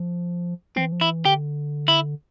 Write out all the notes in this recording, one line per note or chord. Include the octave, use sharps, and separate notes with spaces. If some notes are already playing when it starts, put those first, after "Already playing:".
Already playing: F3
E3 C4
F3
E3 E4
D3 G4
E4